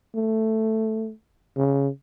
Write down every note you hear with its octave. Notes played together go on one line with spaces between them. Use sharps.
A3
C#3